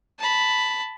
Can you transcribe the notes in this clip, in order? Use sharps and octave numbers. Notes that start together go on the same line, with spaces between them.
A5 B5